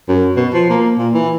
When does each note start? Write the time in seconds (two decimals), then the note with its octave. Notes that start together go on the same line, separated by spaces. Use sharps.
0.09 F#2
0.37 B2
0.54 F3
0.70 A#3
0.98 A#2
1.14 E3